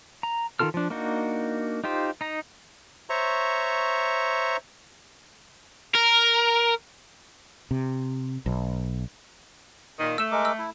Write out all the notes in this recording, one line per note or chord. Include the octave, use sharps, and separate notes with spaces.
A#5
D#3 D4 F4 A4 F6
F3 D4
A#3 D4 D#4 F#4
D#4 F4 G4 C5
D#4 A#5
C5 C#5 E5 A#5 C#6
A#4
C3
B1
A#2 D#3
A3 E6 E7
G#3 A#4 D6
E6
E4